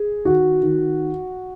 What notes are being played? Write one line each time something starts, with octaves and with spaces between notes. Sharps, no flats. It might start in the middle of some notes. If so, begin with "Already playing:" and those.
Already playing: G#4
D#3 F#4
D#3